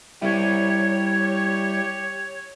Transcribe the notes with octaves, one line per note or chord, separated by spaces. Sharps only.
G3 E4 G4 C#5